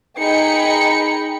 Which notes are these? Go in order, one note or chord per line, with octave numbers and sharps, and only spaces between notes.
D#4 G#4 G5 B5 C#7